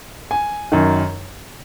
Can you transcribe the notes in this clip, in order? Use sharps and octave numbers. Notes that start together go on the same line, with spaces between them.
G#5
F#2 D#3